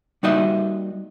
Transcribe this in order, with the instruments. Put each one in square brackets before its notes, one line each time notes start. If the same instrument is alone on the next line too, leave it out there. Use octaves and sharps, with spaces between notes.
[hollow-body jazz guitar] G3 A#3 D#4 F#4 D#5 E5